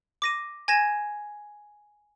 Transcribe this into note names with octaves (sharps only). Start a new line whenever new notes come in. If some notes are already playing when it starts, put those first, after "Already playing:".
D6 A#6 D#7
G#5 G#6 A#6 E7